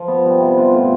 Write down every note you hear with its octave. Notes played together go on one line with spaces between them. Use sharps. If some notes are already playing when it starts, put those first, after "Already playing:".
Already playing: F3
B3
G3
C3
B3 F4
A2